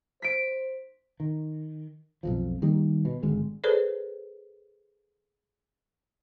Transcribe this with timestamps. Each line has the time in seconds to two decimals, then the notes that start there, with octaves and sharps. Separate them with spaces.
0.22 C5 B6 D7
1.20 D#3
2.23 B1 F2 F3
2.62 D#3 G3 A#3
3.05 B2
3.23 G#1 D3 G#3
3.64 G#4 A4 B4 C5 D5